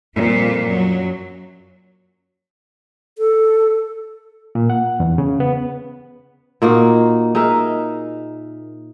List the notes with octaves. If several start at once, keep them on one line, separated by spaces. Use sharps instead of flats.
F2 A#2 G3
F#2 F#3
A4
A#2
F#5
E2
C#3
B3
A#2 A#3 D#4 F#4
D#4 G#4 A#4 E5